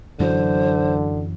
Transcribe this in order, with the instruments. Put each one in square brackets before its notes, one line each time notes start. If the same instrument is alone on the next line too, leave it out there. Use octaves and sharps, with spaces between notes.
[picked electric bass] F#2 E3 F#3 [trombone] D3 [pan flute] C5